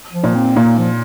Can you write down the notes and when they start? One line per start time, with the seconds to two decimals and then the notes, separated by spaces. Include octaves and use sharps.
0.13 F3
0.24 A#2
0.35 C4
0.56 A#2 A#3
0.78 F3